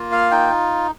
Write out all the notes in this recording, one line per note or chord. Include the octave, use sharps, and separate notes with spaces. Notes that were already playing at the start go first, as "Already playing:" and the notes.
Already playing: A#3 F4
F5
D#4 G5